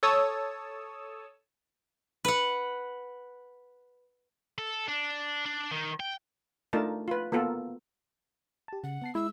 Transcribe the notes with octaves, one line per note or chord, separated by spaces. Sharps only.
A4 C#5 A5 D#6 E6
B4 F#5
A4
D4
D4
D#3
G5
A3 D4 D#4 F4 A#4 A5
F4 B4
A#3 B3 F4 A4 A#4
G4 A5
C#3 F#5
B3 A5 C7
G#3 E4 E6